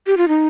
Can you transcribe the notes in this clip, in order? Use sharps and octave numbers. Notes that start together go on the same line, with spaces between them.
G4
F4
D#4